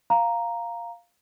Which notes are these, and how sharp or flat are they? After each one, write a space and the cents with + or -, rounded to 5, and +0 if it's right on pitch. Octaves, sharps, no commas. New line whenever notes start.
F5 +0 A#5 +0